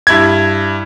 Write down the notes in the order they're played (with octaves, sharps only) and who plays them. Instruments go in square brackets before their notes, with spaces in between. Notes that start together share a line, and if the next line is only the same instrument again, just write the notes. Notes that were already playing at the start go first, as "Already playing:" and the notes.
[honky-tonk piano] G2 E4 G#6